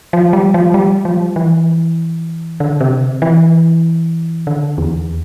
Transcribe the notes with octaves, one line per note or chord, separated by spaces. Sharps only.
F3
G3
F3
G3
F3
E3
D3
C3
E3
D3
E2